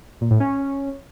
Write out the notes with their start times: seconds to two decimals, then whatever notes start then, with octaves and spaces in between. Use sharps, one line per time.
0.21 A#2
0.31 A2
0.40 C#4